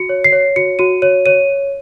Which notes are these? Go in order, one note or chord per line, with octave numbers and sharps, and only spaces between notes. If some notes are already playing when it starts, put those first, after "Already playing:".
Already playing: F#4 C#7
C#5
C7
C#5
F#4 C#7
F#4 D#7
C#5 D#7
C#5 D#7